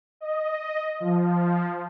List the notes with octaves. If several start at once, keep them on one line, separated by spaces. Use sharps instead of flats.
D#5
F3